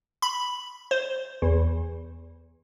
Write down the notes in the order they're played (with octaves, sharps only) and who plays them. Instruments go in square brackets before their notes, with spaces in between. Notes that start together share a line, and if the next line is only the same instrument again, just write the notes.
[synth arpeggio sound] B5
C5
E2